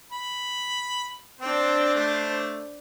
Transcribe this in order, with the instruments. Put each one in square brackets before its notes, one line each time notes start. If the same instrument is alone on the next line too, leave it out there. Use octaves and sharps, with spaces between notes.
[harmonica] B5
[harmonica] C4 [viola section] D4 C5
[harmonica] A3